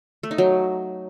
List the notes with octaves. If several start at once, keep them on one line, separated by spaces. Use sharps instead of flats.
A3
D#4
F#3